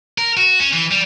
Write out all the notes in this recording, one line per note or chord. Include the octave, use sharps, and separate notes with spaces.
A#4
F#4
C#4
E3
G3